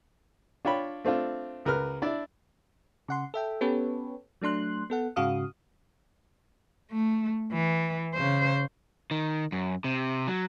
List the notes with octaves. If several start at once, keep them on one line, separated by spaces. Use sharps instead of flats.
D4 F4 C#5 G5 B5
A3 C4 D4 F4
C#2 A#4 B4 F6
D4 E4 D5
C#3 F#5 C6
A4 E5 G5
B3 C#4 G4 A4 B4 C#5
F#3 A3 D4 C6 F#6
B3 A4 F#5
G#2 C#3 F#4 F5 D#6
A3
E3
C#3 C5
D#3
F#2
C3
F#3